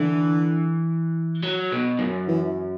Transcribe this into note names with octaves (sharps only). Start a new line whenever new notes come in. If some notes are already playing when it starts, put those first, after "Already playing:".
Already playing: D3 E3
F#3
B2
F#2
E3